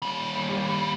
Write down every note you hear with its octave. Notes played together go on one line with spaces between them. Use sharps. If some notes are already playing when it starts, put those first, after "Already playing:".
D#2 G3